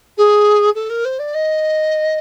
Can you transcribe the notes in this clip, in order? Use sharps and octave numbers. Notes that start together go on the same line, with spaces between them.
G#4
A4
A#4
C5
D5
D#5